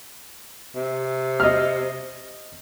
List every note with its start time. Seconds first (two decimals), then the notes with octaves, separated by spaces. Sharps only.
0.75 C3
1.40 D#5 F6